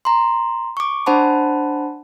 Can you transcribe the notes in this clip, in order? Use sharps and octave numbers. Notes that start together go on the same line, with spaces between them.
A#5 C6
C#6 D6
D4 C5 F#5 A5 B5